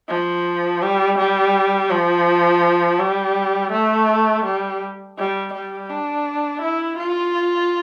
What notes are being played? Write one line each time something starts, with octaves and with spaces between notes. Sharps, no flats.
F3
G3
G3
F3
G3
A3
G3
G3
G3
D4
E4
F4